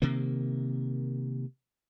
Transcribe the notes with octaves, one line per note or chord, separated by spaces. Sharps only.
C3 D#3 A#3